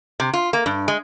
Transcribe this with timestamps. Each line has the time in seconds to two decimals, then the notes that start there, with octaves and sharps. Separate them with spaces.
0.20 C3
0.33 F4
0.53 A#3
0.66 G2
0.88 G#3